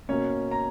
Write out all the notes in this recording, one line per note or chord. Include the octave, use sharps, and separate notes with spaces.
B2 A#3 C#4 C#5
A#5